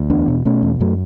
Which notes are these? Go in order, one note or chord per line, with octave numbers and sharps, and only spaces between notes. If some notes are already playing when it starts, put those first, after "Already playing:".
Already playing: D2
E2 B3 D4
B2
B2 A3 C#4
E2
F#2 F#3 A3